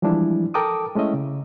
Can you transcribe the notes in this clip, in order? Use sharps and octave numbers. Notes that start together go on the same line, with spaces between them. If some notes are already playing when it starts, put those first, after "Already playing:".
E3 F3 G3 G#3 D4 E4
A4 A#4 G5 A5 D6 D#6
G#3 A3 C#4 E4 D#5 E5
C#3